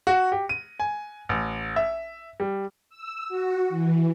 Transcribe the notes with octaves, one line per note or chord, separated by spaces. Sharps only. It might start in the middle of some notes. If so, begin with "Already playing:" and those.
F#4
G4
D#7
G#5
A1
E5
G3
E6
F#4
E3